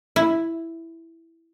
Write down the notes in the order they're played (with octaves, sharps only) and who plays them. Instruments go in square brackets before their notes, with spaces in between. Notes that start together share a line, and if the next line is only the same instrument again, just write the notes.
[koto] E4